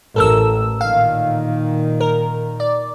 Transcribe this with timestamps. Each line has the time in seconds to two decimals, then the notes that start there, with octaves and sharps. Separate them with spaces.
0.16 A1 A4 A#4 E6
0.81 A#2 D#3 F5
2.00 A#4
2.60 D5